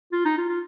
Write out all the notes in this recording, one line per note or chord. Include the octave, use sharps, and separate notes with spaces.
F4
D#4
F4
F4